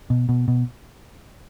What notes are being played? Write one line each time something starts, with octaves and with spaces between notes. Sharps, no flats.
B2
B2
B2